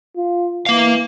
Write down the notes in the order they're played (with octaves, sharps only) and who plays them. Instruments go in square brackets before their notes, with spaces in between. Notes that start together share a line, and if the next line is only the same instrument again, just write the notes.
[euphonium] F4
[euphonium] E3 [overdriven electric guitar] A#3 F5